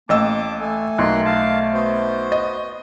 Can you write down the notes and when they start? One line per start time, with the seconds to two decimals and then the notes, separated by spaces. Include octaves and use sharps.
0.09 A1 A#3 D#5 A5 D6 E6
0.61 A3 A4 G#5
0.98 B1 A#3 C6 F#6
1.25 F5 A5
1.74 B3 F#4 C5
2.32 D#5